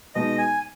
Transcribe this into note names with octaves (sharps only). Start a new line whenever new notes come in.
B2 G#3 B3 D#4 D#5
G#5